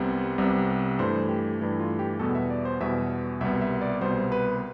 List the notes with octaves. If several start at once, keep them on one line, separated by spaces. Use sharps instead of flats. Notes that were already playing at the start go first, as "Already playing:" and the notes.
Already playing: C2 C3 G3 B3
C2 C3 G3 B3
G2 E3 A3 C5
G4
G2 E3 A3
F4
G4
E2 B2 G3 B3 A4
E5
D5
C5
E2 B2 G3 B3 E5
C2 B2 G3 B3 E5
E5
D5
C2 B2 G3 B3 C5
B4